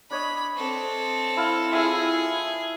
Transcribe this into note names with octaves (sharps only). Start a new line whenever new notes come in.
D4 C#5 D#5 B5
C4 A4
E4 F5 A5
E4 F4 G#4 E5